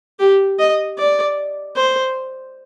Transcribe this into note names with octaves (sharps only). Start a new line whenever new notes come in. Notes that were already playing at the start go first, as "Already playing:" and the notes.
G4
D#5
D5
C5